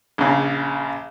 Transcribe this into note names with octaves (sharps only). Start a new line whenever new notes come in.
A#1 C#3